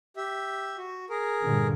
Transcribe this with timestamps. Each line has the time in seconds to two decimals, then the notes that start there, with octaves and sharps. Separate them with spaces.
0.17 G4 E5
0.77 F#4
1.10 G#4 A#4
1.42 G2 A#2 D3